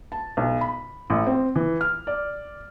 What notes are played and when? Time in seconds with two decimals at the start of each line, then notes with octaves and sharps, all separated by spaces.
0.12 A5
0.37 B1
0.61 B5
1.10 A1
1.27 C4
1.56 E3
1.81 F6
2.07 D5